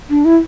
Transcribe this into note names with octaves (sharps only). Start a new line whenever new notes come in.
D4
E4